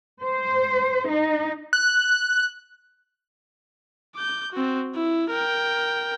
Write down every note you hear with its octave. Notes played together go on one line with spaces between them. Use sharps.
C5
D#4
F#6
D6 G6
C4 F#4
E4
A#4 G5